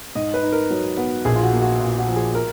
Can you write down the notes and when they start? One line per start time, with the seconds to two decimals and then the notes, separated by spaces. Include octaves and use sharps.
0.15 G#2 D#5
0.34 B4
0.43 D#4
0.52 A#4
0.71 F#3
0.97 B3
1.25 A#1 G#4
1.35 F4
1.43 F#4
1.53 A#3
1.61 F#4
1.80 A#2 F4
1.98 F#4
2.08 F3
2.16 G#4
2.35 A#4